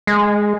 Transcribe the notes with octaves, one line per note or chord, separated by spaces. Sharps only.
G#3